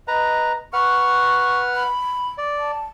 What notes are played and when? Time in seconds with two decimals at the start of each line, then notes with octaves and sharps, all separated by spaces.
0.08 B4 D#5 A#5
0.73 B4 F#5 C#6 F6
1.74 B5
2.38 D5
2.58 A5